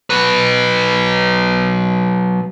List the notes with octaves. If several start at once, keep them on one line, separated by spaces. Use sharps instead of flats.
F#3 B4